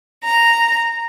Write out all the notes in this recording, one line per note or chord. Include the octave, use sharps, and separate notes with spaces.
A#5